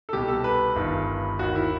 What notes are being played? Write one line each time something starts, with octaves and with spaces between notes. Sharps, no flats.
A4
C2 B2 G4
A4
B4
G1 G2 D#3
D#2 D#3 F#4
E4